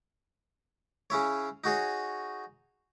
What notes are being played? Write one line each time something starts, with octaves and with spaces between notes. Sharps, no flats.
C#3 C#4 E4 C#5
D#4 F#4 G#4 C#5